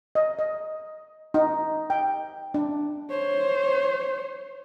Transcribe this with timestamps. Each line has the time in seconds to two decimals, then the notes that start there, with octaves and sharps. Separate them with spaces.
0.15 D#5
0.39 D#5
1.34 D#4
1.90 G5
2.54 D4
3.10 C5 C#5